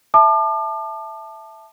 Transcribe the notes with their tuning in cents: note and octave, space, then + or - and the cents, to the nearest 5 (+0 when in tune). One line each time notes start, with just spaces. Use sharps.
E5 +0 A5 +0 D6 +40